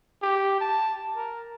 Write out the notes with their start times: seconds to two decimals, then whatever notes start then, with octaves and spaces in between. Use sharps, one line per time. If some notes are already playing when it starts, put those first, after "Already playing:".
0.22 G4
0.60 A5
1.17 A#4